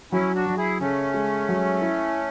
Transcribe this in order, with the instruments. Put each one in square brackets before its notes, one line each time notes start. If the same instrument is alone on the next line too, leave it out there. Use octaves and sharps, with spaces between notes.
[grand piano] F#3 [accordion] C#4 E4
[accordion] D4 F#4
[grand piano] F#3
[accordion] E4 G#4
[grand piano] C#3 [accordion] A3 C#4
[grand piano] G#3
F#3
E4